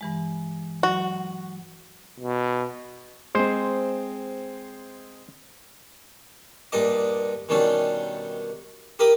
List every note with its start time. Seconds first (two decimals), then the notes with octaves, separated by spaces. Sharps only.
0.01 G2 E3 G#3
0.83 F#3 F#4
2.20 B2
3.35 G#3 C4 C5
6.72 G2 A#2 D4 D#5 D6
7.49 B2 D#3 G3 C#4 D4
8.99 G4 A#4 B5 D6 D#6